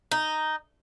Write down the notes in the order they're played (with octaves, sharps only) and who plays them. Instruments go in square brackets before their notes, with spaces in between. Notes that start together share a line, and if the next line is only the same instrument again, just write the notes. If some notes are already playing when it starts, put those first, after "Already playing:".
[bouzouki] D#4